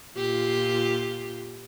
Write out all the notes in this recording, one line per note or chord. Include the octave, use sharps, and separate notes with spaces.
A#2 F4 G4